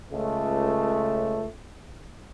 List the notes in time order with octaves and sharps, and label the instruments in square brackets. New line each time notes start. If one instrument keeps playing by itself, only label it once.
[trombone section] C#2 A3